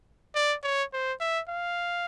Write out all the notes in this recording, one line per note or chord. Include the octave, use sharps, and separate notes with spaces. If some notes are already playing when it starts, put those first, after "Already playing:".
D5
C#5
C5
E5
F5